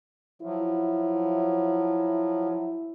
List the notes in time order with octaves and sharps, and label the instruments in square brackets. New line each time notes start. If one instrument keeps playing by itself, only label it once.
[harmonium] F3 F#3 [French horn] E4